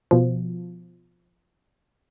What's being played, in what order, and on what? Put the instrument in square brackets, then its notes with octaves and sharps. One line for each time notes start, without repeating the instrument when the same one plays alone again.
[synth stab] B2 F3